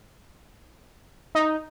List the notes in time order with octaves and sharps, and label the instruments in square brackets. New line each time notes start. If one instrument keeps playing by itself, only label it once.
[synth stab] D#4